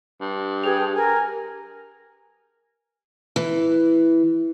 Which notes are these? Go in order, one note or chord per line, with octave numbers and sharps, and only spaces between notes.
G2
G4 G#4 B4 G5 F7
A#4 G#5
E3